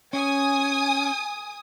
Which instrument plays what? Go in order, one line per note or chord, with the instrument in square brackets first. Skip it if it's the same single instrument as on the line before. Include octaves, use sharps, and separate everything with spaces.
[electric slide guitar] C#4 [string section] G#5 D#6